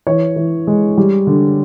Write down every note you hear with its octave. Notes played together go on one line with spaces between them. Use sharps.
E3 C#5
E3
G#3
G3
D3